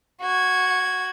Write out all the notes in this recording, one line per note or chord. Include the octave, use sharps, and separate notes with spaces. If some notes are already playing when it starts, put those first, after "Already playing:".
F#4 G#6